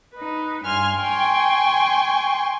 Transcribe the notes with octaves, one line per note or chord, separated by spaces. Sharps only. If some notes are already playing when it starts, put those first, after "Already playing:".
D#4 B4
G2 G#5 C6 F6
G5 G#5 C6 C#6